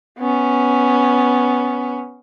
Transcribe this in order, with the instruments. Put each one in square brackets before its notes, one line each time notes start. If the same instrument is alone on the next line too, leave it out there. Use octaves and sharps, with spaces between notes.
[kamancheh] B3 C#4